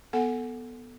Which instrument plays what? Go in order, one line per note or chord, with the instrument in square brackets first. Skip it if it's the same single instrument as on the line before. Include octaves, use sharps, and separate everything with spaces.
[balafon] B3 A4 F#5 G#5